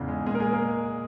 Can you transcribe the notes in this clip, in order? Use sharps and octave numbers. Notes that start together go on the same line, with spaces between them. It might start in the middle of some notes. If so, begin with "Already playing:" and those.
Already playing: E2 G#2 C#3
G#3
A#2 G#3 G#4
A#4
G#3 G#4
A#3 A#4